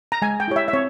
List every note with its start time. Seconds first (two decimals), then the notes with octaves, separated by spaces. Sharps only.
0.12 A#5
0.22 G#3 G#5
0.40 G5
0.48 E4 G4 C#5
0.56 E5
0.68 E5
0.73 C4 C#5